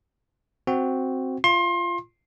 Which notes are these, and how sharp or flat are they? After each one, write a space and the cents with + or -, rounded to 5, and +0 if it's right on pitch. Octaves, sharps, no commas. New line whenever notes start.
C4 +0 F#4 +0
F4 -20 C6 +30